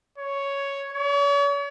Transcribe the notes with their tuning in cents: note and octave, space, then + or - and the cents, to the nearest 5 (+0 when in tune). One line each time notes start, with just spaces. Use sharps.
C#5 +5
C#5 +40